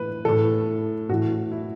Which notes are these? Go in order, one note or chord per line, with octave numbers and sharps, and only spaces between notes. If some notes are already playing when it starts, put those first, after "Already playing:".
Already playing: A2 E3 B4
A2 E3 A4
A2 E3 F#4
E4